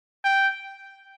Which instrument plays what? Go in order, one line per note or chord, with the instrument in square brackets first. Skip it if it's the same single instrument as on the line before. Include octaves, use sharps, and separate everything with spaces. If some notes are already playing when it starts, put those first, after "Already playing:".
[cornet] G5